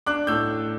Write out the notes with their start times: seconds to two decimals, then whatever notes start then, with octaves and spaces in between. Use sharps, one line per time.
0.06 D4 D6 F#6
0.27 A2 E6 G6